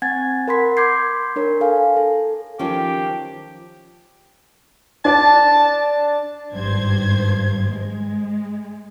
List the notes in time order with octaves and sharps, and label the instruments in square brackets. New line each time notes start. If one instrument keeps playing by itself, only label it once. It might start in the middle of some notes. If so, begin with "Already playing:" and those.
[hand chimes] C4 F#5 G#5 G#6 A6
A#4 F#5 B5 C6 B6
C6 D6 G6 G#6 C7
D4 A#4 C#5
A4 F5 G#5
A4
[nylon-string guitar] D#3 F3 C#4 [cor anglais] G4
[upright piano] D4 D5 [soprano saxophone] A5
[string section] G#1 G2 C5 G#6
G#3